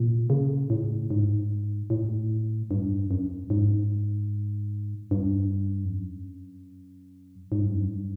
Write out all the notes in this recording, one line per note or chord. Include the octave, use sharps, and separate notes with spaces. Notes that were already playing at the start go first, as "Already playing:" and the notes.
Already playing: A#2
C#3
A2
G#2
A2
G2
F#2
G#2
G2
F2
F#2
G#2
G2
F#2
G2